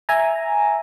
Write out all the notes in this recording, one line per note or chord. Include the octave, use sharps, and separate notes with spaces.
E5 G#5 A#5